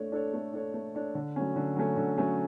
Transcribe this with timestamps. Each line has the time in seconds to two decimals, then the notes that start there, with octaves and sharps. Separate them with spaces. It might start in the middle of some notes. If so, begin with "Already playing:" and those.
Already playing: A3 D4 A4 C#5
0.12 D4 A4 C#5
0.34 A3
0.54 D4 A4 C#5
0.74 A3
0.95 D4 A4 C#5
1.15 D3
1.36 F#3 A3 C#4
1.56 D3
1.76 F#3 A3 C#4
1.97 D3
2.18 F#3 A3 C#4